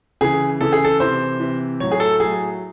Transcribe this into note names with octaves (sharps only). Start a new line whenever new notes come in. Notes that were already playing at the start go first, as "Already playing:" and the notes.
C#3 E3 G#4
C#3 E3 A4
G#4
A4
C3 E3 C5
C3 E3
A2 F#3 C#5
G#4
A4
A2 F#3 G#4